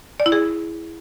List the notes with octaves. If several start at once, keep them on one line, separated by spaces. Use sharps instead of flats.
D5
E4
G#4